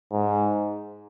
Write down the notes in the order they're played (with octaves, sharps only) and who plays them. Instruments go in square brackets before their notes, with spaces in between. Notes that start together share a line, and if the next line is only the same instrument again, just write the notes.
[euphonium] G#2